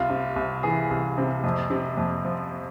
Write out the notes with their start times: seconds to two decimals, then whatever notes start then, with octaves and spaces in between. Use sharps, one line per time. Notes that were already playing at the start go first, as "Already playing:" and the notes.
Already playing: C2 F4
0.10 C3
0.36 C2
0.63 E3 G#4
0.91 C2
1.18 C3
1.44 F2
1.70 C3
1.98 F2
2.25 F3